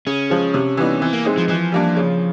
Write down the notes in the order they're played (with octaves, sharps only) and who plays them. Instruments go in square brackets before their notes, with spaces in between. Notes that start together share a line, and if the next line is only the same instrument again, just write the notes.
[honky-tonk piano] C#3 [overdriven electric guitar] C#4
[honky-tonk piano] F3 G#3
C3
E3 G3 B3 D#4
[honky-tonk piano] E3 [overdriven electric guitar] C4
[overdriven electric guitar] A#3
[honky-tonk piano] G#3 C4 D#4
[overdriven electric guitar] F3
[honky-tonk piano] E3 [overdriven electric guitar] F3
[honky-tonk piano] G3 A#3 D4
C#3